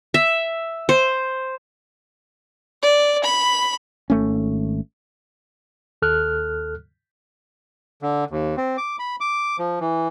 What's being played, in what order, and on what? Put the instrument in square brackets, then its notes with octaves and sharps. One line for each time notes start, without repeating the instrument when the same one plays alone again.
[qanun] E5
C5
[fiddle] D5
B5
[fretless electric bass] G#1 A3 C#4
[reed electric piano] D#2 A4 F6 F#6
[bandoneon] D3
D#2
C4
D6
B5
D6
F3
E3